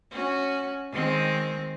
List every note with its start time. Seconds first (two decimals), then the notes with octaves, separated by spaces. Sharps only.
0.11 C#4 F#4
0.92 D#3 G#3 C4